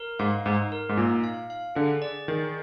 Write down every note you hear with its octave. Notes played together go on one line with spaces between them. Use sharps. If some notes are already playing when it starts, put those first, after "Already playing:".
Already playing: A#4
G#2 F5
G#2 D#4
A#4
G#2
A#2 D#4
F5
F5
D3 G#4
D5
D#3 G#4